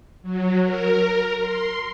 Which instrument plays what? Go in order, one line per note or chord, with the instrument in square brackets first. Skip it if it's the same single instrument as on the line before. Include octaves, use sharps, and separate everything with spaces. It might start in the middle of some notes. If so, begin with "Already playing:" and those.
[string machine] F#3
A#4
C6